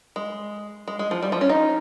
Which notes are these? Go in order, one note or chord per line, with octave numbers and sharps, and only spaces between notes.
G#3
G#3
G#3
F3
G3
F3
C#4
D#4